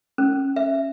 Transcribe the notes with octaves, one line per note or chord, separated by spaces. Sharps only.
C#4
E5